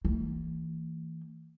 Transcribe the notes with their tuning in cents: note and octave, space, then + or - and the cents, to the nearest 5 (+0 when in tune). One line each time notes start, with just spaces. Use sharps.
E3 -20 A#3 -45